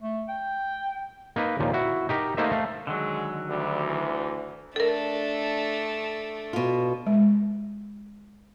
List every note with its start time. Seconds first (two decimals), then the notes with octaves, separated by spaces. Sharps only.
0.02 A3
0.28 G5
1.36 A#3 D#4 B4
1.59 D#2 A#2 F3
1.73 E4 F#4
2.09 D#4 G4 A#4
2.37 A3 A#3 D#4 C5 D#5 E5
2.51 A3 F5
2.87 D3 D#3 F#3 G#3
3.49 D2 G3
3.86 E3
4.76 A3 D4 A4 A#4
6.53 B2 F4
7.07 G#3